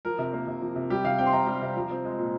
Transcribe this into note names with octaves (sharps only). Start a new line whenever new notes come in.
F3 A#4
C3
A#3
C3
F3
C3
G3 G4
C3 F5
C4 G5
C6
C3 A#5
G3
C3
F3
C4
G#3
A#2